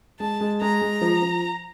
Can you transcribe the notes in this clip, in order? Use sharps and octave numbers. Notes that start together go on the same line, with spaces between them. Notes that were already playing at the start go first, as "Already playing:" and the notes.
G#3 A5
G#3
G#3 A#5
G#3
F3
F3